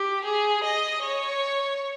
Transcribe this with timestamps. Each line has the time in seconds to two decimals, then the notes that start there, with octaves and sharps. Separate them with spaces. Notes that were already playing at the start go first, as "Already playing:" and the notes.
Already playing: G4
0.24 G#4
0.64 D#5
1.02 C#5